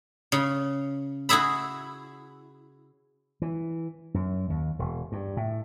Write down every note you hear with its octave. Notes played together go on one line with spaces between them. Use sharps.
C#3
E4 F#4 G#4 E5 B5
E3
F#2
D#2
E1
G2
A2